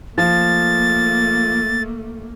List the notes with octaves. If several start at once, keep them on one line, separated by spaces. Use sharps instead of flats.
F3 A3 A#3 A6